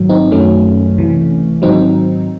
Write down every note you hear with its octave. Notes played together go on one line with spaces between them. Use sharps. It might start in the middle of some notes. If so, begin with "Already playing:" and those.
Already playing: G#2 D#3 F#3
C4 D#4
F#2 D#3 F#3 A3 C#4
C#2 C3 E3
G#2 D#3 F#3 C4 D#4